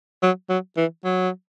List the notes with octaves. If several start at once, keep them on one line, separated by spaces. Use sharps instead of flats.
F#3
F#3
E3
F#3